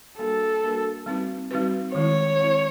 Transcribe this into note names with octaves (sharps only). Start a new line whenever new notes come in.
G3 A#3 D4 F#4 A4 A#4
G3 A#3 D4 F#4 A#4
G3 C4 D#4 F#4 B4
G3 C4 D#4 F#4 B4
D#3 G#3 C4 E4 C#5
D#3 G#3 C4 E4